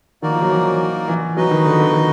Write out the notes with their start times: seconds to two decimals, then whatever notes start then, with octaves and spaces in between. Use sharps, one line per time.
0.22 D#3 A#3 D#4 F#4 A#4 D5
0.32 F3
0.42 F#3
0.51 E3
1.08 E3
1.37 F#3 B3 D#4 F#4 B4 D#5
1.51 D#3
1.66 D3
1.80 D3
1.94 D#3